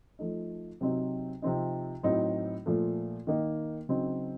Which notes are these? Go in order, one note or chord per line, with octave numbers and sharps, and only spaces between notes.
F3 A3 D#4
C3 F#3 C4 D#4
C3 F3 C4 D#4
A2 F#3 C4 D#4
A#2 F3 A3
D#3 A#3 D#4
C#3 F#3 C4 D#4